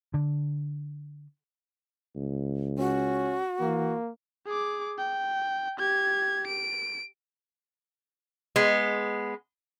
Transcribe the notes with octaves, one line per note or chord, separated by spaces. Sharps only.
D3
C#2
C#4 F#4
E3 A#3
G#4 D6
G5
G4 G#6
D7
G#3 B3